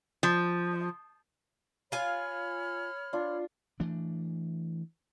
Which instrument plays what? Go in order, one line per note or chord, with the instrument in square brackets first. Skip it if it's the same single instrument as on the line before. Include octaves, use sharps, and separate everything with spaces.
[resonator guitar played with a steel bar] F3
[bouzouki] F4 G#5 [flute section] C#5 B5 F6
[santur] D4 F4
[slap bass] E3 A3 D4